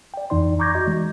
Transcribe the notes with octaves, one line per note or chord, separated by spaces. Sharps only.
D5 G5
F2 E3 D#4 D5 C6
A#5 C#6 D6 G6 G#6 A#6
F#4 D#5
E3 G#3